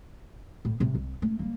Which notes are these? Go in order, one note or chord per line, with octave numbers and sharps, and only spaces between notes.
A2
A1 C3
C2
A3 C#4
G3 A#3